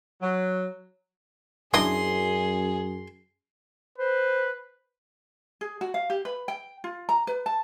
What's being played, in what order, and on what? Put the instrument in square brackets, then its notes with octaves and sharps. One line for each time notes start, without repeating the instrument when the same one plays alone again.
[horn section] F#3
[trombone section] F#2 [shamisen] D4 E4 D#5 [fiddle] G#4 [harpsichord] C6
[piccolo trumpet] B4 [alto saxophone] C5
[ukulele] G#4
F#4
F5
G4
B4
G5
F4
A#5
B4
A5